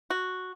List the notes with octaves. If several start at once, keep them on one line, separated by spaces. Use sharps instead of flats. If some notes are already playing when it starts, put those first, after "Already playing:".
F#4